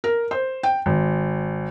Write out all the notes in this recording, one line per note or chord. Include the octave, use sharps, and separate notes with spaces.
A#4
C5
G5
G#1